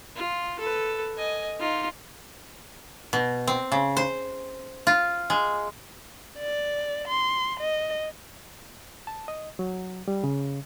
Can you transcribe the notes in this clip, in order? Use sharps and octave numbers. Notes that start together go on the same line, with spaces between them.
F4
A4 B4
D#5 G#5
D#4 F4
B2
C4
C#3
C5
F4
G#3
D5
C6
D#5
A5
D#5
F#3
G3
C#3